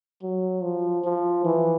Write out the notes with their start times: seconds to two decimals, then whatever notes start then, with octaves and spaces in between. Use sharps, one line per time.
0.23 F#3
0.62 F3
1.04 F3
1.45 E3